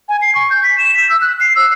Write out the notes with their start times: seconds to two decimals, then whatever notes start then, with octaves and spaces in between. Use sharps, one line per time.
0.09 G#5
0.22 C7
0.35 C#6
0.50 G6
0.64 B6
0.78 E7
0.95 B6
1.09 E6
1.21 F#6
1.40 C7
1.56 E6